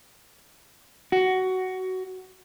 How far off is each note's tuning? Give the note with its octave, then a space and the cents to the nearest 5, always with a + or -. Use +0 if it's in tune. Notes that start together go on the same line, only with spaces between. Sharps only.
F#4 +15